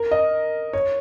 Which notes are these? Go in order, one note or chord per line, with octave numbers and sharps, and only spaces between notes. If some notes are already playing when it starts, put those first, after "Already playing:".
Already playing: A#4
D#5
C#5